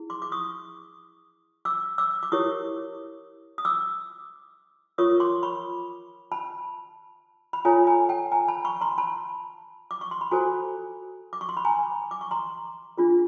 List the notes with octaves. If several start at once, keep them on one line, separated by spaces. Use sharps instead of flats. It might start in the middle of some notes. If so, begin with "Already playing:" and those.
Already playing: E4 G#4
C6 D6
D6
C#6 D#6
D6 E6
D6 E6
D6
E4 G4 A#4 C#5 C#6 D#6
D#6
D6 E6
F4 A#4 C#5 C#6 D#6
C6 D6
B5 C#6
A5 B5
B5
F4 A4 C#5 G#5 A#5
G#5 A#5
G5 A5
G#5 A#5
A5 B5
B5 C#6
A#5 C6
A5 B5
D6
C#6
C6
B5
F#4 A4 C5 G#5 A#5
D6
C#6
C6
B5
G#5 A#5
D6
C#6
A#5 C6
D4 F4 G#4